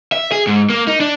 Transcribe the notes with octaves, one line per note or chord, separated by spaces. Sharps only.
E5
G#4
G#2
A#3
D#4
D4